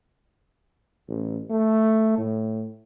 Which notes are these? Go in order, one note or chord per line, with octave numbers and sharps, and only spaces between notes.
A1
A3
A2